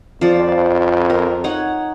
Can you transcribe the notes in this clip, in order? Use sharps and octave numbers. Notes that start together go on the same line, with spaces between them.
F2 F3 D5
A#4
D#4 C#5 F#5